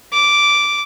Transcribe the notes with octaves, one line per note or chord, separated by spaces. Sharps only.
D6